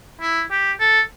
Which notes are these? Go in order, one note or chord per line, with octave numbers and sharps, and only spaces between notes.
E4
G4
A4